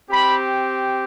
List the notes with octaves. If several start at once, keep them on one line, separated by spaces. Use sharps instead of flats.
C4 G4 B5